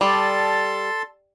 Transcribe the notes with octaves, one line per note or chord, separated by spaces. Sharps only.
G3 A4 A5 C6